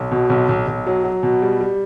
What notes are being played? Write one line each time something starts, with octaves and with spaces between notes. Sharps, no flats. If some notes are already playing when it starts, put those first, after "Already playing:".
Already playing: B1
B2
B1
B1
B1
F#3
F#3
B2
G3
G3